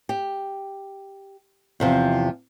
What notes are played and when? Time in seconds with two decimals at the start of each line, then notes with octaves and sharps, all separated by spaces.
0.09 G4
1.80 E2 C3 F3